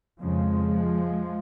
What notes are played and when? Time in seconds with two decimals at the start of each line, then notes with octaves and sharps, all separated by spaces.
0.20 F2 C#3 F3 G#3